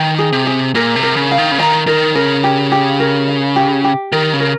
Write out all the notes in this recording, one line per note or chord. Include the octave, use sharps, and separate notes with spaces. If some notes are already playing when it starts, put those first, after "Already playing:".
Already playing: D#3 G5
G#4
C3
G#4
A#2 A#4
C3
A#4
C#3
F5
D#3
C#3
D#3 A#5
D#3 A#4
C#3 A#4
G4
G4
A#4
F5
G4
G4
D#3 A#4
C#3
A#4